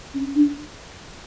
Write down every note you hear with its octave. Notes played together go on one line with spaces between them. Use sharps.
C#4
D4